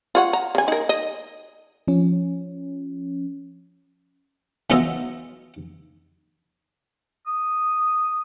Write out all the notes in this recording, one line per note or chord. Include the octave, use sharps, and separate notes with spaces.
F4 C#5 F#5
A#5
C#3 G#5
D#4 A#4
D#5
F3 C#4
E3 F#3 B3 F4 D#5 E5
D#6